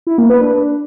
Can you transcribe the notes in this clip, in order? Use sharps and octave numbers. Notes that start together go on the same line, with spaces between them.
E4
A#3
B4
D4